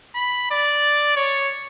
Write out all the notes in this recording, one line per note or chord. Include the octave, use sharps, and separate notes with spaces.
B5
D5
C#5